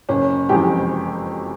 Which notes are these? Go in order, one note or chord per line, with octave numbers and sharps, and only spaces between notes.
F#1 C#4
F2 C3 E3 G#3 G4